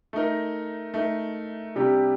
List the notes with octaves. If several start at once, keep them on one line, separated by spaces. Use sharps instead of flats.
A3 D#4 A#4
A3 D#4 A#4
C3 G3 D4 G4